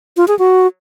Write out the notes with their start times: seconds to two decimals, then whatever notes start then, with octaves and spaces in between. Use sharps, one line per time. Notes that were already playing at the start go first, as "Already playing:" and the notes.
0.17 F4
0.28 G#4
0.39 F#4